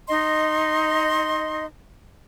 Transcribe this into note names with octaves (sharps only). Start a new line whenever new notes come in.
D#4 D#5 C6